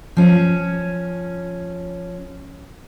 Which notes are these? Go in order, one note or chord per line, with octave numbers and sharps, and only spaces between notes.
F3 C#4